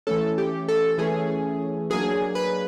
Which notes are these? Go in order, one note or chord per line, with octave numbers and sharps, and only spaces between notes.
E3 A3 C#4 A4
G4
A4
E3 A3 C#4 G#4
F#3 A#3 D4 G#4
B4